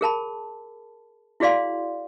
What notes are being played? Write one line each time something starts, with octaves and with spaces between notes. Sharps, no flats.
G#4 A#4 A5 B5
E4 F#4 G#4 D5 F5 C6